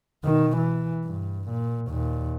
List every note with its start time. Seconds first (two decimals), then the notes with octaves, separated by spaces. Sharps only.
0.24 B2 D#3
0.57 E3
1.05 G2
1.50 A#2
1.88 D#2 A#2